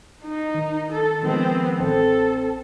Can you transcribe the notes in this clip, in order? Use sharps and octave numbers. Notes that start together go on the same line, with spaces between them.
D#4
D#3
A4
D#3 F3 G#3 B3 C4
A1 C4 A4